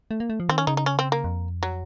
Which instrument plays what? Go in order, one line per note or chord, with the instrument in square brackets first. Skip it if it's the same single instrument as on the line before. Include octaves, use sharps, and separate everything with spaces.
[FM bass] A3
A#3
A3
F3
[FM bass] D#3 [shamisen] C4
[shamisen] C#4
[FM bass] C#3 [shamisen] D#4
[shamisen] D#4
C#4
C4
A#3
[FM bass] F2
[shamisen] F#3